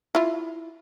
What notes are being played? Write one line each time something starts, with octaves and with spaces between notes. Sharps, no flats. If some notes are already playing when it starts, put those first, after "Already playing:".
E4 F4